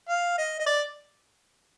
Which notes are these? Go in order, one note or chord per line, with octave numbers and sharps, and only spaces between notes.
F5
D#5
D#5
D5